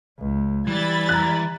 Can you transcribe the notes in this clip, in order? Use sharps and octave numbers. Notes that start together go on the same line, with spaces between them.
C#2
E3 G3 B5 G#6 A6
A#5 F#6